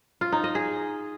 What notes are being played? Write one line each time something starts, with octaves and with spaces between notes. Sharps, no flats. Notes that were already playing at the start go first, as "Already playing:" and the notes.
F4
D#4
D#5
G#4